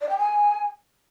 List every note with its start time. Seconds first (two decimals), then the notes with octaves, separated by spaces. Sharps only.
0.01 D5
0.09 G5
0.18 G#5